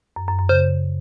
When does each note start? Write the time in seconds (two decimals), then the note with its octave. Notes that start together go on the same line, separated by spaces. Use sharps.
0.16 F#2
0.28 F#2
0.39 F#2
0.49 C#3 C5